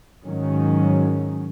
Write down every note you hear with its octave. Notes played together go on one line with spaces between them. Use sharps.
G#2 D#3 F#3 C#4